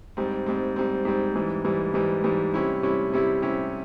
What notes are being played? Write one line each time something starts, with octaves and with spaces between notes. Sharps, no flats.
G#2 G3 C4
G#2 G3 C4
G#2 G3 C4
G#2 G3 C4
G#2 E3 G3
G#2 E3 G3
G#2 E3 G3
G#2 E3 G3
C3 G3 C#4 E4
C3 G3 C#4 E4
C3 G3 C#4 E4
C3 G3 C#4 E4